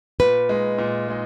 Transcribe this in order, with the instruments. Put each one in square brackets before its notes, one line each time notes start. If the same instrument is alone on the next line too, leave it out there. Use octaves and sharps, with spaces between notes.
[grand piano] A#2 [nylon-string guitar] B4
[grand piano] G#3 D#4
A#2
G#3 D#4